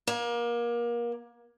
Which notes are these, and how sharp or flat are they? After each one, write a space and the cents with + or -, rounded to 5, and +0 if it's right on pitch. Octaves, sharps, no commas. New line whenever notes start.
A#3 +30